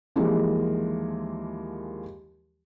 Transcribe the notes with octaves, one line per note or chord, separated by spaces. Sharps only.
D#2 E3 F3 G#3 A#3